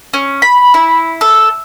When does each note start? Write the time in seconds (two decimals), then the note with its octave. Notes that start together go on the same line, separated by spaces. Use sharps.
0.13 C#4
0.42 B5
0.74 E4
1.21 A4